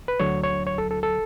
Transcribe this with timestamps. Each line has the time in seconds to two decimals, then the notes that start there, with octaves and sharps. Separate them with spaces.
0.08 B4
0.20 D2 D3 F#3 C#5
0.44 C#5
0.67 C#5
0.78 A4
0.91 A4
1.03 A4